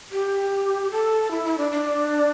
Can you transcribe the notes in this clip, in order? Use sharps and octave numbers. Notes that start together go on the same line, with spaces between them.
G4
A4
E4
E4
D4
D4